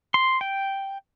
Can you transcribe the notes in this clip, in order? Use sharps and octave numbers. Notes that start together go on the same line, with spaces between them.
C6
G5